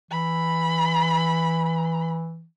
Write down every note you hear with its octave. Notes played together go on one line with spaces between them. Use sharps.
E3 B5